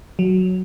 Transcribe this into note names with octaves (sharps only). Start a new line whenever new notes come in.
F#3